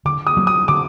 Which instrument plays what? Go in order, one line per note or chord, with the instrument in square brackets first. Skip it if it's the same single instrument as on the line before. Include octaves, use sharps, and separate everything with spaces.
[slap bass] D3 [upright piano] D6
[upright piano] D#6
[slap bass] F#3 A#3 D4
[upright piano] D#6
[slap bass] D3 [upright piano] D6